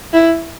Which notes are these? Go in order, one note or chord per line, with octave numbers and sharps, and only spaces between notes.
E4